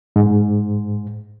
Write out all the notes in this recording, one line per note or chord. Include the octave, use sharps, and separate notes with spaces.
G#2